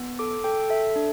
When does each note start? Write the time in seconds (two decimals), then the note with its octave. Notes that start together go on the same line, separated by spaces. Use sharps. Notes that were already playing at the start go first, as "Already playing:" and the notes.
Already playing: B3
0.19 A4 D6
0.44 A4 G5
0.70 A4 E5
0.96 D4